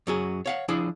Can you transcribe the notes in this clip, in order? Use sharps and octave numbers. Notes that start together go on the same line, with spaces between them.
F#2 F#3 G#4
C#5 F5 F#5
F3 D4 E4 G#4